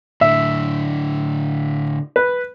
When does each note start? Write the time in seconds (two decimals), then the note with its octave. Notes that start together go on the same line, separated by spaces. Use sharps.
0.21 A2 D3 E5
2.16 B4